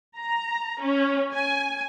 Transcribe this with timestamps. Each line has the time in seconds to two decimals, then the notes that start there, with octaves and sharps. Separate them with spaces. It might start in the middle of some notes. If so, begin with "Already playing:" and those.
0.18 A#5
0.81 C#4
1.34 G#5